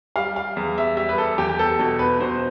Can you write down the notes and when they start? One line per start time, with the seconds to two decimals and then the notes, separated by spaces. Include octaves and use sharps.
0.16 G3 F5
0.36 F5
0.57 E2
0.78 E5
0.97 G3 E5
1.09 B4
1.18 A4
1.38 E2 G4
1.49 G4
1.59 A4
1.79 B2 A4
1.99 B4
2.20 B2 C5